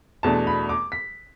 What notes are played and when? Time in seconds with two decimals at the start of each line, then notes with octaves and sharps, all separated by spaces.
0.23 E2 B2 A3 D4 A5
0.47 B5
0.69 D6
0.92 B6